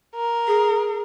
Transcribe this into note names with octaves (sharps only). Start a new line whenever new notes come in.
A#4
G#4